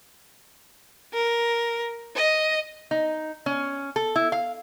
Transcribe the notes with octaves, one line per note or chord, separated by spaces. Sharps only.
A#4
D#5
D#4
C#4
A4
E4
F5